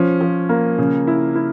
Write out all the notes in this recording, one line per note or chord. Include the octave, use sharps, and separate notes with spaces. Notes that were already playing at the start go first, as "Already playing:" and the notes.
Already playing: F3 C#4
F3
A#3
C#3
E4
E4